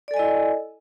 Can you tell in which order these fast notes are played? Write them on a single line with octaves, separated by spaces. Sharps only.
D5 A4 G#5 D#5 E4